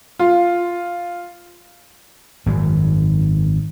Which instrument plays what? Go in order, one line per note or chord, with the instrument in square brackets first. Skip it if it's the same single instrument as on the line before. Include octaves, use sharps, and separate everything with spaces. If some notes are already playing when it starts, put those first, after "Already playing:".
[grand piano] F4
[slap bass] G#1 F#2